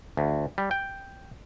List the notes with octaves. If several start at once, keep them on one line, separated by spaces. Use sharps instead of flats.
D2
G3
G5